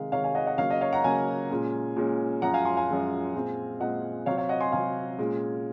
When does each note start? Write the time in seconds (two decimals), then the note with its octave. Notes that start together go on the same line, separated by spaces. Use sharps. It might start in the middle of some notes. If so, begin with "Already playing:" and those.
Already playing: C3 D#3 G#3 F5
0.12 C3 D#3 G#3 C#5 F5
0.24 F5 G#5
0.35 D#5 F#5
0.47 D#5 F#5
0.58 C#3 F#3 A#3 C#5 F5
0.70 D#5
0.81 C#5 F5
0.93 F#5 A#5
1.04 C#3 F#3 A#3 F5 G#5
1.50 A#2 G#3 C#4
1.96 A#2 G#3 C#4
2.42 F#2 F3 G#3 C#4 F#5 A#5
2.54 F5 G#5
2.65 G#5 C6
2.77 F5 G#5
2.88 F#2 F3 G#3 C#4
3.34 A#2 G#3 C4
3.80 A#2 G#3 C4 D#5 F#5
4.26 C3 F#3 C4 C#5 F5
4.38 C#5 F5
4.49 D#5 F#5
4.60 G#5 C6
4.72 C3 F#3 C4 F5 G#5
5.18 A#2 G#3 C#4